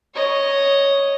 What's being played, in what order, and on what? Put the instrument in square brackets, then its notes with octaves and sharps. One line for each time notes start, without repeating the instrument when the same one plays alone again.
[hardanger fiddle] C#5 D#5